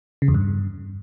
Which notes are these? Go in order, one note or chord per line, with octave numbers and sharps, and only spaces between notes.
C#3
E2
G2